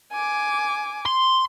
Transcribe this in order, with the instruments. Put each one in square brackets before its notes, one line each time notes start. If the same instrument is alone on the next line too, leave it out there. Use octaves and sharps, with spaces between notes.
[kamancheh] G#5 D6
[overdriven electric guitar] C6